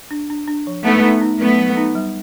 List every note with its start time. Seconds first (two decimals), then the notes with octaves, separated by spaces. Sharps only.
0.11 D4
0.30 D4
0.48 D4
0.67 F3
0.85 A3 B3 D#4
1.03 D#4
1.21 D#4
1.40 F#3 A3 B3
1.58 F#3
1.77 D#4
1.95 G3